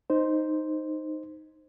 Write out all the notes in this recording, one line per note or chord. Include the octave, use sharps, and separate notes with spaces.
D#4 C5